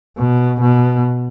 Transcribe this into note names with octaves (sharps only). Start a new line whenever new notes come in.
B2
B2